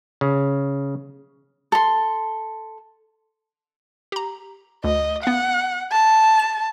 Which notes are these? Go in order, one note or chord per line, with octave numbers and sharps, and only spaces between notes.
C#3
A4 C6
G4 A#5
D2 D#5
B3 F5 F#5
A5
E7